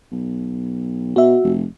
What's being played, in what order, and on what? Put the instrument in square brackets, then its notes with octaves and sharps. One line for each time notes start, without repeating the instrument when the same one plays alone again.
[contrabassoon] B1
[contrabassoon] B2 [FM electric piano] F#4 E5
[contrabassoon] F1